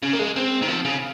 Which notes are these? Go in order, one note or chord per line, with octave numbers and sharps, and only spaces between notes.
C#3
A#3
G#3
C4
D#3
F3
C#3